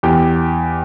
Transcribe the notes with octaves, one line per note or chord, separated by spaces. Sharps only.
E2 G4